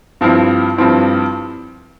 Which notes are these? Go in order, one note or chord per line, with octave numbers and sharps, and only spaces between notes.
G2 F3 C4 E4
G2 F3 C4 E4